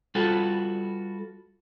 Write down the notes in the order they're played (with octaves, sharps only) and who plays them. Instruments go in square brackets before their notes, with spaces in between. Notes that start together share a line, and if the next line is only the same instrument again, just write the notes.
[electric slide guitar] G3 F4 F#4 A4 B4